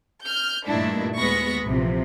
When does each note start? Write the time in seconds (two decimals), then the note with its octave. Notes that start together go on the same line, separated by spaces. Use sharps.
0.24 F6 G6
0.67 G2 A#2 D#3 A3 D4 E4
1.18 D#2 G#3 B3 B5 C#6 A#6
1.64 A#1 C3 E3 F3